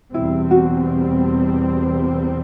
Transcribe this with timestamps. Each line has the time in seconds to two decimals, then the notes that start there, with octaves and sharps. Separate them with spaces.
0.14 E2 B2 G3 C4 E4
0.51 F#4